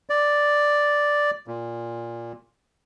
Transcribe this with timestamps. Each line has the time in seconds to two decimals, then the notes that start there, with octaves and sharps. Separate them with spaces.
0.10 D5
1.48 A#2